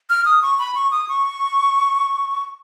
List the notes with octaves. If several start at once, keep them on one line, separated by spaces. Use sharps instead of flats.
F6
D#6
C#6
B5
C#6
D#6
C#6